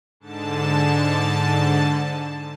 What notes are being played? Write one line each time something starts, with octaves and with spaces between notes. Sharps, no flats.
G#2 D3 A5